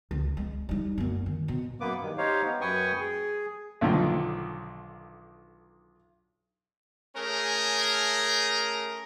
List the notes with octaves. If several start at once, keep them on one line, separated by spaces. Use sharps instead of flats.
C#2
G#3
G3 D#4
F#2 A#3
D#3
B2
F#2 A#3 B3 B4 D6
G2 D#3
D#4 G4 C5 C#5 F5
B3
F#2 B4 G5 G#5 C#6 D#6
G#4
B1 D3 D#3 F3
A3 C#4 G#4 A#4